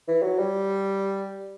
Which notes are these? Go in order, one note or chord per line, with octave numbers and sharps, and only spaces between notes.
E3
F#3
G3